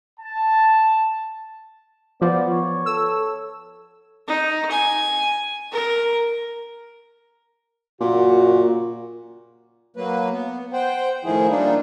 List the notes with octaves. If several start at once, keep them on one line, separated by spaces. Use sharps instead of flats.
A5
F3 B3 D5
C#5
A4 E6
D#4
G#5
A#4
F#2 A#2 C#3 F#4
F#3 A#3 B4
B3
C5 F#5 G5
A2 D#3 F3 E4 G#4
G3 A#3 D4 D#4 F4